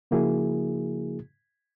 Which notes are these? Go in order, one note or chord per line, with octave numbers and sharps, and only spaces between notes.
C#3 F3 A#3 E4 F#4 G#4